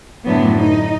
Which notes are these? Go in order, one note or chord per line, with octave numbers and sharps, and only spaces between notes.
F#2 A2 D3 F#3 B3
D#4